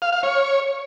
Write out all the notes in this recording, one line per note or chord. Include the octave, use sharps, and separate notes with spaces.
F5
F5
C#5